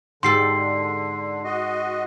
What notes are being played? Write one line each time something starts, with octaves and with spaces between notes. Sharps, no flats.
G#2 D3 G4 A4 C6 C7
F#4 D#5